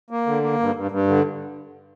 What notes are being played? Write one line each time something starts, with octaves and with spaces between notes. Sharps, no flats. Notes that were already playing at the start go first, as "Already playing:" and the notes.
A#3
D3
A#3
G2
G2
G2
D3